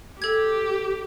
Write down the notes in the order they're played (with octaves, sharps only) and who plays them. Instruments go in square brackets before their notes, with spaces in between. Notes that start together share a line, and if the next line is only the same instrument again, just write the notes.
[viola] G4 [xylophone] A4 G#6